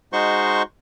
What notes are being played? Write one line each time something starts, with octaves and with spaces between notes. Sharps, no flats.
G#3 D#4 F#4 C5 C6 C#6